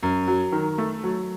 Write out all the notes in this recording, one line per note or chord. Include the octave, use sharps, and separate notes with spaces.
F#2
F#3
D#3
A3
F#3